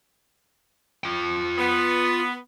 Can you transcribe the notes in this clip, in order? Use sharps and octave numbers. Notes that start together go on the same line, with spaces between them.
F4 G5
B3